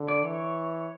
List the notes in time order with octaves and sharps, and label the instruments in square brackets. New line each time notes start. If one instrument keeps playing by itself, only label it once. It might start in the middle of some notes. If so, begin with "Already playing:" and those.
Already playing: [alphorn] D3
[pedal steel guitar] D5
[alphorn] E3 [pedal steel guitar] C#5